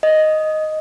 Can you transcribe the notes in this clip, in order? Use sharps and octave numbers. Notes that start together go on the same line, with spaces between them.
D#5